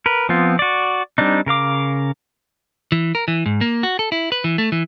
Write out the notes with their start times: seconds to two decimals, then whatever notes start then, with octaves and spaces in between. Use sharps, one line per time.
0.06 A#4 B4
0.29 F3 B3 C4 F4
0.59 F#4 D5
1.18 G3 C4 D4 D#4
1.46 C#3 A#4 F5 D6
2.92 E3
3.15 A#4
3.28 E3
3.46 G#2
3.61 A#3
3.83 F#4
3.99 A4
4.12 E4
4.32 B4
4.44 E3
4.58 A3
4.72 E3